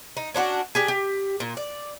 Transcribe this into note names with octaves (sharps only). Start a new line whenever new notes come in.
D#4
C#4 D4 F4 F#4
D4 G4 G#4
G4
A#2
D5